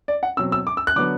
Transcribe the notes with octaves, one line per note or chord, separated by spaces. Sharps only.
D5
F#5
B2 F#3 C4 E6
E6
D6
E6
F#6
D3 F#3 B3 D6